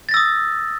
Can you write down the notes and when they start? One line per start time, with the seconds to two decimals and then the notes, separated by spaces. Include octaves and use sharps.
0.09 A6
0.11 A#6
0.14 E6
0.17 D#6